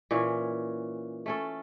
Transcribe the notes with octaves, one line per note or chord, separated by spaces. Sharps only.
A#2 E3 C#4 C#5
A3 C#4 A4